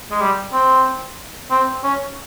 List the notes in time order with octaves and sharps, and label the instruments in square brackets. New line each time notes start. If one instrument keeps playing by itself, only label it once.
[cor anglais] G#3
G3
C4
C4
C#4